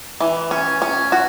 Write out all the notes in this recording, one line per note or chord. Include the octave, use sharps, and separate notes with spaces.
E3
C#4
C#4
F#4